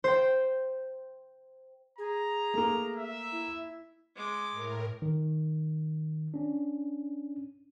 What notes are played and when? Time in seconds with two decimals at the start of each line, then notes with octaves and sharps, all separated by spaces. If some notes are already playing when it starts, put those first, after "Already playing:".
0.04 C5 G5
1.98 G#4 A#5
2.54 A3 A#3
2.96 E5
3.32 E4
4.16 G#3 D6
4.52 A2 A#4
5.02 D#3
6.34 C#4 D4